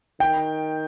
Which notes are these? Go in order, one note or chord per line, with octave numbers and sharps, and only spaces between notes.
D#3 G5